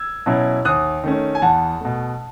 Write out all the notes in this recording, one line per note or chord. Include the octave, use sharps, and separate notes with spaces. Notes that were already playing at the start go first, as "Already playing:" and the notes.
Already playing: E6 G#6
B2 F#3 C#4 E4
D#2 D#6 F#6
D#3 A3 C#4
G#5
E2 F#5 A5
B2 A3